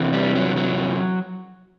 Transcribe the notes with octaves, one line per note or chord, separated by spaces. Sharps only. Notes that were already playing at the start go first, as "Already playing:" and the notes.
Already playing: E2 C3 E3
G3
F#3
F#3